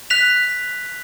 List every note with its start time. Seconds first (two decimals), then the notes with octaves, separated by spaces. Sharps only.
0.10 F#6 B6 F7